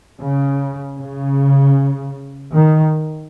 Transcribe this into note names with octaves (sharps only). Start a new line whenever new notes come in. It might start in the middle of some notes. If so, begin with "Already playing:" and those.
C#3
C#3
D#3